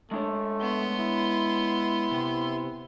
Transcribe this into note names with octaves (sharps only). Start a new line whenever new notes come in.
G#3 A3 D4 C#5
B3 C6
E4
C3